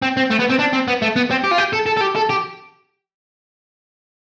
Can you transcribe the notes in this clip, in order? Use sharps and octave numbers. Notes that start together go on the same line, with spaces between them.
C4
C4
A3
B3
C4
D4
C4
B3
A3
B3
C4
G4
F4
G4
A4
A4
A4
G4
A4
G4